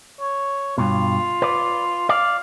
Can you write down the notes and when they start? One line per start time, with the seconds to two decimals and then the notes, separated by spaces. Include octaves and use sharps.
0.20 C#5
0.78 G2 B2 F4
1.42 B4 D5
2.09 D5 F5